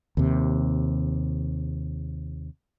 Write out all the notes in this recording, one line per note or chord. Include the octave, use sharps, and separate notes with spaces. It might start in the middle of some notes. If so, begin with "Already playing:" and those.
D#2 C3